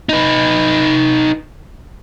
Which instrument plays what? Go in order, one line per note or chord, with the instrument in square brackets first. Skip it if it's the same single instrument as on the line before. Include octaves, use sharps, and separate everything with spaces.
[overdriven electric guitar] D#4 B4